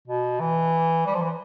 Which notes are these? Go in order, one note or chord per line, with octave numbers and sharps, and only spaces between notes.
B2
E3
G3
F3
E3